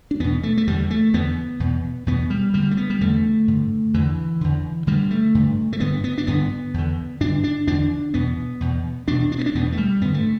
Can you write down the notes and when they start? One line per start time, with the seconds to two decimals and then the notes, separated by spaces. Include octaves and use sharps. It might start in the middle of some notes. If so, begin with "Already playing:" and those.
0.11 D4
0.20 E2 B2 B3
0.43 A3
0.57 A3
0.67 E2 D3 G3
0.90 A3
1.13 E2 D3 B3
1.60 E2 B2
2.06 E2 B2 B3
2.30 G3
2.54 G2 D3 G3
2.71 A3
2.77 B3
2.90 G3
3.01 E2 D3 A3
3.48 G2 D3
3.94 E2 D3 E3
4.41 E2 D3
4.87 G2 D3 G3
5.11 A3
5.35 G2 D3
5.73 A3
5.80 G2 D3 B3
6.04 B3
6.18 D4
6.27 G2 D3 B3
6.74 E2 D3
7.21 G2 D3 D4
7.44 D4
7.67 E2 D3 D4
8.14 E2 B2 B3
8.61 E2 B2
9.08 E2 B2 D4
9.32 D4
9.38 B3
9.46 D4
9.55 E2 B2 B3
9.72 A3
9.77 G3
10.01 G2 D3 B3
10.14 A3